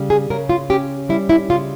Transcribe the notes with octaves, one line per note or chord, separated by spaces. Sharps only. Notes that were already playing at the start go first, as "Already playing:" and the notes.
Already playing: C#3 G3
G#4
C#3 A#4
F4
C#4 G4
G3 E4
E4
C#3 F4